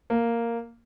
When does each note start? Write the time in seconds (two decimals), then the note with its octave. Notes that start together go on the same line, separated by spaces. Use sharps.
0.10 A#3